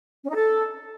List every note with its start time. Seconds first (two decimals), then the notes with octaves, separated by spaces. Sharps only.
0.24 C#4
0.29 D#4
0.35 A4